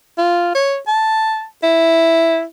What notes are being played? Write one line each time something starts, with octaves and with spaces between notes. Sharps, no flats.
F4
C#5
A5
E4